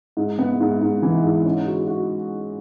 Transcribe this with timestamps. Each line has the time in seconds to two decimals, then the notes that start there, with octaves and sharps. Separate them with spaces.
0.17 G#2
0.39 B3
0.60 G#2
0.81 G#2
1.02 E3
1.24 G#2
1.45 C#4
1.66 F#4
1.87 F#4